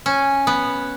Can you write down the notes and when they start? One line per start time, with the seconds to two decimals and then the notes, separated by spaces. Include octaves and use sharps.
0.06 C#4
0.47 B3